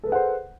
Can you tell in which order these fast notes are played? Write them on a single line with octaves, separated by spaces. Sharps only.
A4 B4 G#4 F#5 C5